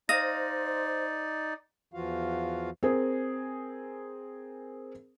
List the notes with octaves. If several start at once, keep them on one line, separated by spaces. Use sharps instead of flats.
D#4 C5 D5 D#5 F5 D#6 A#6
E2 E3 F3 F4 F#4 F5
C4 G#4 A#4